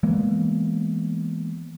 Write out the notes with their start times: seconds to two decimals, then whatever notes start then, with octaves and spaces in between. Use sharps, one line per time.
0.03 E3 G#3 A#3 B3